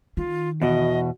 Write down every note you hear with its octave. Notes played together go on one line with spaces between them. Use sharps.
D#3 F4
E2 B2 F#4 D#5